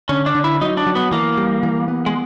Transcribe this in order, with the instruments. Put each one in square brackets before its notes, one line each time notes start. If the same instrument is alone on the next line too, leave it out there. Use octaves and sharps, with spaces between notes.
[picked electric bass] D3 [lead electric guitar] C#4
[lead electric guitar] D4
[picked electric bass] D3
[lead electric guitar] E4
[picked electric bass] F#3 [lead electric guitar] D#4
[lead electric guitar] D4
[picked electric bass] F#3
[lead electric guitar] B3
[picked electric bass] E3 [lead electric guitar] A#3
[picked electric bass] G3
E3
B3
[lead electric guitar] G#3